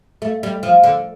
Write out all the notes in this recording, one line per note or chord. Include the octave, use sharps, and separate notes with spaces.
A3
G3
F3
D3